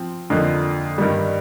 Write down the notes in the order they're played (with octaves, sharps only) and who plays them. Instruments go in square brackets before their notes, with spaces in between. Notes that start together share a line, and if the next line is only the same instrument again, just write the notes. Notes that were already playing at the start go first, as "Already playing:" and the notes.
Already playing: [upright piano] F3 C4
F2 D3 F3 A#3 D#4
G2 D#3 G3